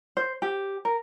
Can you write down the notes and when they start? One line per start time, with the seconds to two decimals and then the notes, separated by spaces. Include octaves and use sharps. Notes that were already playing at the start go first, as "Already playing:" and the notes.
0.17 C5
0.42 G4
0.85 A#4